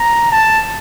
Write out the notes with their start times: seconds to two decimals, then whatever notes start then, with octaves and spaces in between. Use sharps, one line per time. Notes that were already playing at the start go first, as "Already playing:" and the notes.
Already playing: A#5
0.32 A5